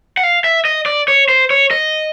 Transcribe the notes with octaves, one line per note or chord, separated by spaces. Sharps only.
F#5
F5
E5
D#5
D5
C#5
C5
C#5
D#5